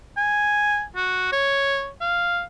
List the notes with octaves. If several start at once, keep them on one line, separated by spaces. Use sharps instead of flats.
G#5
F#4
C#5
F5